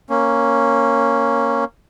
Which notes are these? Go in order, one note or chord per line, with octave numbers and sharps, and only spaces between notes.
A#3 C#4